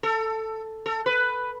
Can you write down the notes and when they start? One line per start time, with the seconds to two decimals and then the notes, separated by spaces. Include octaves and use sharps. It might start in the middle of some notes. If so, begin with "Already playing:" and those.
0.03 A4
0.86 A4
1.06 B4